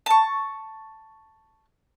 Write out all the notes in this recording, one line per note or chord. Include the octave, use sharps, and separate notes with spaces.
A5 C#6